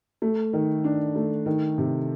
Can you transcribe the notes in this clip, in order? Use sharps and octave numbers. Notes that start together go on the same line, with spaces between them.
A3
D#3
D4
A3
D#3
C3